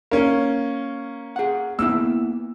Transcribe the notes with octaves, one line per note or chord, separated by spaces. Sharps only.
A#3 C#4
G#4 F#5
A#3 B3 E4 E6